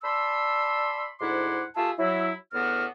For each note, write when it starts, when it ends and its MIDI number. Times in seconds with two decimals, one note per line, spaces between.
0.03 1.07 74
0.03 1.07 81
0.03 1.07 83
0.03 1.07 84
0.03 1.07 88
1.20 1.64 38
1.20 1.64 44
1.20 1.64 64
1.20 1.64 78
1.20 1.64 84
1.20 1.64 86
1.76 1.91 57
1.76 1.91 65
1.76 1.91 67
1.76 1.91 68
1.76 1.91 76
1.76 1.91 81
1.99 2.33 54
1.99 2.33 64
2.53 2.86 40
2.53 2.86 45
2.53 2.86 59
2.53 2.86 62
2.53 2.86 66
2.53 2.86 89